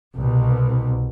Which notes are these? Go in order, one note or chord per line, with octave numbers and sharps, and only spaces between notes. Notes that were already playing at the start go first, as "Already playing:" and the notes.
C2 B2